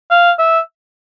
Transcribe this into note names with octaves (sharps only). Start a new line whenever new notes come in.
F5
E5